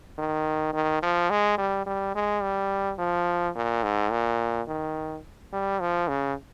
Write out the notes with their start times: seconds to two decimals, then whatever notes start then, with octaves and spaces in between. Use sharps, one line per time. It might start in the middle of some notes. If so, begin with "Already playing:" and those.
0.18 D#3
0.73 D#3
1.02 F3
1.30 G#3
1.58 G3
1.86 G3
2.15 G#3
2.42 G3
2.99 F3
3.55 A#2
3.83 G#2
4.11 A#2
4.68 D#3
5.53 G3
5.80 F3
6.08 C#3